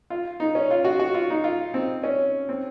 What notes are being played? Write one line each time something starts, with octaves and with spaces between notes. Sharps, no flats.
F4
D#4
C#4
F4
F#4
F#4
F4
D#4
F4
C4
C#4
C4